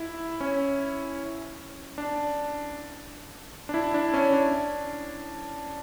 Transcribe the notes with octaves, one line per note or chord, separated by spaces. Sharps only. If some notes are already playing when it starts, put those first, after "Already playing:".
Already playing: E4
C#4
D4
D4
E4
D4
C#4
D4